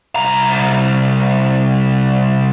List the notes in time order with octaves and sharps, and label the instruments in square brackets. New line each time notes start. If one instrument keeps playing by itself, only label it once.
[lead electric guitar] C2 A#5